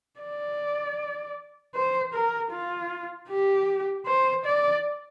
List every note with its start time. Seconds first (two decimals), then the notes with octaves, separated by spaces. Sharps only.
0.20 D5
1.74 C5
2.13 A#4
2.51 F4
3.29 G4
4.06 C5
4.45 D5